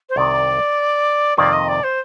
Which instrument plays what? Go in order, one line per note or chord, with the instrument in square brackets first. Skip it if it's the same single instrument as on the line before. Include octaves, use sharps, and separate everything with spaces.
[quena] C5
[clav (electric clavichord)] C2 C3 D#3 [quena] D5
[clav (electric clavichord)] F2 C3 D#3 A#3 F4 [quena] D5
[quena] D#5
D5
C5